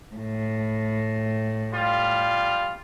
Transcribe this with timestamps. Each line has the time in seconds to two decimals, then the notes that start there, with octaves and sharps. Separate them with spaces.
0.15 A2
1.72 G3 F4